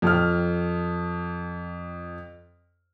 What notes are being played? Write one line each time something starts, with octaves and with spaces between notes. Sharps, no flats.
F2 F6